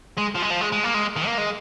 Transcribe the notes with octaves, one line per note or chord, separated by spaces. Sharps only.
G#3
F3
G#3
F3
G#3
G#3
A#3
G#3
D#3
A#3
G#3